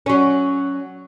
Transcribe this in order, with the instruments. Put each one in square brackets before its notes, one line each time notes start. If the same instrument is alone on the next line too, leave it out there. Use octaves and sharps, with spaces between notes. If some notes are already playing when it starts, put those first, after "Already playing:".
[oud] F#3 C#4